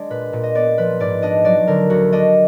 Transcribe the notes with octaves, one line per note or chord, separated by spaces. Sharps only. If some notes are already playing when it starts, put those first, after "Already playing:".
Already playing: G#3 D4 D5
A#2 B4
A#2
D#5
B3 D5
F3 B4
G#2 D5
D4 D#5
F#3 D5
D3 A#4
D2 F#4
D4 D#5